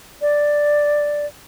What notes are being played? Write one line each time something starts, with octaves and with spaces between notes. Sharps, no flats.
D5